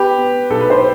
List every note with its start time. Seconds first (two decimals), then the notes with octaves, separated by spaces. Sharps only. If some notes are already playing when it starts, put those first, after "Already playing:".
Already playing: B3 G4 B4
0.18 B3
0.50 B1 A4
0.61 B4
0.70 C5